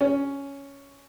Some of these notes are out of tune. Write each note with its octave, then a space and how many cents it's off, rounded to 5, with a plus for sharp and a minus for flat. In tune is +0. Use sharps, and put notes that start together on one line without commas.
C#4 +5